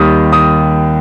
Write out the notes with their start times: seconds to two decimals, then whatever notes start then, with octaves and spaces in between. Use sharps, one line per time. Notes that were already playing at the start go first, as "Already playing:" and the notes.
Already playing: D#2 D#3 G3 D#6
0.32 D#6